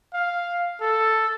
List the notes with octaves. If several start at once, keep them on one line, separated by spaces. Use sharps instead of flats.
F5
A4